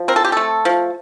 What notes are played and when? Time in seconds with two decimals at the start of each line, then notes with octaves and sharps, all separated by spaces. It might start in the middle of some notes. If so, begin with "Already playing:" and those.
Already playing: F3
0.08 C4 A#4
0.16 A4
0.25 G4
0.32 A3 A4
0.65 F3